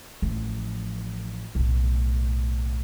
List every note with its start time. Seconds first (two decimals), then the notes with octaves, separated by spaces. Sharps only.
0.22 A1 F3
1.55 B1 A2